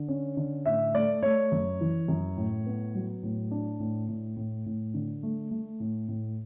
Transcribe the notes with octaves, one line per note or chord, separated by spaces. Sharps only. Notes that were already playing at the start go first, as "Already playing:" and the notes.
Already playing: D3
C#4
D3
A2 E5
A3 D5
A3 C#5
F#2
E3
F#2
A2
B3
F#3
A2
D4
A2
A2
A2
A2
D3
A3
A3
A2
A2